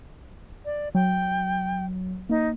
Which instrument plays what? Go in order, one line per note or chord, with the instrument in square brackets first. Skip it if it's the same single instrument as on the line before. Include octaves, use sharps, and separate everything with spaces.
[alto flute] D5
[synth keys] F#3 [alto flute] G5
[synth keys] A#3 [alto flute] D#4